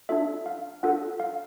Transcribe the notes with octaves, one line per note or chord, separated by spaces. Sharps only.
D4 F4 A4 E5
F5
D4 F4 A4 F#5
F5